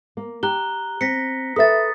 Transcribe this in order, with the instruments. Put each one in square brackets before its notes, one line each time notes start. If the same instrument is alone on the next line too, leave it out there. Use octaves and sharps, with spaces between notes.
[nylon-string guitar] A#3
[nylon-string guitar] G4 [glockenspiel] A#5 F#6 G7
[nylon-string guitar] C4 [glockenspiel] A#6 B6 C#7
[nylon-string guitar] A4 B4 E5 [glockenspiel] D#6 A6